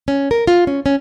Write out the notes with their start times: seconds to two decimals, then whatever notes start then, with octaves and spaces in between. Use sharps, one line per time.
0.08 C#4
0.31 A#4
0.47 F4
0.67 C#4
0.86 C#4